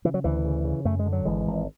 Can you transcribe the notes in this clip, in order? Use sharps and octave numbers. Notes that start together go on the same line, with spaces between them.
C#3 E3
F#3
D2 E3
C#3
C#3
F#2 A3
G#3
D3
F#3
G#1 E3 G#3
G#1